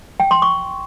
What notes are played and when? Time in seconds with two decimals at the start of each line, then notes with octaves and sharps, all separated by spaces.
0.20 G5
0.31 C6
0.42 C#6